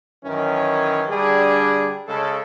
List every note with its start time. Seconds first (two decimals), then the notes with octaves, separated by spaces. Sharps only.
0.24 F#2 D#3 E3 C#4
1.08 D3 G3 D4 G#4
2.07 C#3 G#3 A4